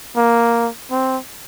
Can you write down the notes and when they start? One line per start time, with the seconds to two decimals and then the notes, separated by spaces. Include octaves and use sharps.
0.16 A#3
0.91 C4